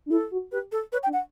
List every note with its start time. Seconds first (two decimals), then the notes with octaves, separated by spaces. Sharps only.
0.06 D4
0.10 E4 A4
0.31 F#4
0.52 G4 B4
0.72 A4
0.92 B4 C#5
1.03 G5
1.07 D4
1.13 F#5